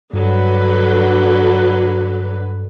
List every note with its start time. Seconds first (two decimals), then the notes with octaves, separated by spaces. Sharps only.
0.13 G2 D3 F#3 B4